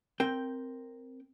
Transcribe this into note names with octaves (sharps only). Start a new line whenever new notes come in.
C4 A#4 G5